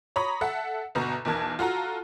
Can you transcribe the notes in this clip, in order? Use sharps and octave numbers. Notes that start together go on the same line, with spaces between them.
C#5 A#5 B5 D#6
A4 E5 F#5
G1 B2 A#5
B1 E2 A#4 A5 G#6
F4 F#4 A4 A#5